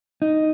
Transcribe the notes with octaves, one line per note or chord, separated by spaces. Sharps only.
D#4